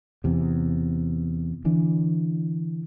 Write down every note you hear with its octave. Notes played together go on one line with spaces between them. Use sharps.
E2 C3
D3 E3 D4